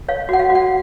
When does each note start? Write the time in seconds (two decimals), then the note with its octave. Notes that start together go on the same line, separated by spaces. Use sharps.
0.09 C#5 F5
0.29 F#4 F#5
0.39 F5
0.50 F#4
0.55 F#5